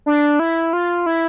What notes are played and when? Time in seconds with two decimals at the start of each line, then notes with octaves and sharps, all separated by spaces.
0.06 D4
0.39 E4
0.73 F4
1.06 E4